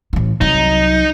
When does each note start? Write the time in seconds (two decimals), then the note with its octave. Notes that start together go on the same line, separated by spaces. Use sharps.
0.13 A1 E3
0.41 C2 F#3 D#4